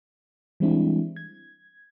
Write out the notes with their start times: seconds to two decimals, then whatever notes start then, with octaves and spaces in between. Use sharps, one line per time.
0.60 E3 G3 G#3 C4 D4 E4
1.16 G#6